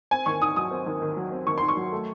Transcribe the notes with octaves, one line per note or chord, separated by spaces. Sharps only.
C4 G#5
D#2 C#6
D#3 D#6
F#3 D#6
C4
D#2
D#3
F#3
C4
D#2 C#6
D#3 C6
C#6
F#3
A3